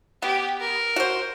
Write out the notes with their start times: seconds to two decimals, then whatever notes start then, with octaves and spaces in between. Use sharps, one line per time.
0.22 B3 G4
0.61 A#4
0.96 F#4 C5